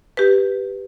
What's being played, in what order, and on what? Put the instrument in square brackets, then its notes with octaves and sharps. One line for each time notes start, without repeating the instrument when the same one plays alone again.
[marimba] G4 B4